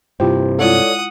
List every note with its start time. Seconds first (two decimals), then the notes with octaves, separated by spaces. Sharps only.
0.20 G2 C3 E4 F4 G4 C5 G5
0.59 G#3 E4 F4 A4 C#5 D5 F#5 D#6